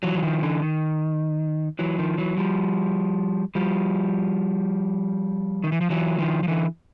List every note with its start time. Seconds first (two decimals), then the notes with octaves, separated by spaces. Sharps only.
0.03 E3 F#3
0.15 E3
0.22 D#3 F3
0.42 D3 E3
0.62 D#3
1.79 E3 F#3
1.98 D#3 F3
2.18 E3 F#3
2.37 F3 G3
3.55 F3 G3
5.64 D#3
5.72 E3
5.81 F3
5.90 E3 F#3
6.19 D#3 F3
6.43 F3
6.48 D3 E3